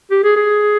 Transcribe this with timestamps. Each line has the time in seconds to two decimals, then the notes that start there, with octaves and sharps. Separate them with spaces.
0.11 G4
0.24 G#4
0.36 G#4